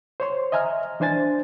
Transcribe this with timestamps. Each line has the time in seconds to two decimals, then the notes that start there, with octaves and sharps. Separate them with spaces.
0.20 C5 C#5 C6
0.52 D#5 E5 G#5 A#5 F6
1.00 E3 D4 C5 G#5 A6